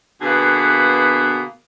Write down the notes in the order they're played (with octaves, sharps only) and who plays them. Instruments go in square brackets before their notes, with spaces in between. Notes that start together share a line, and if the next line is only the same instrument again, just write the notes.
[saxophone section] B2 D3 A#3 B3 G#4 B4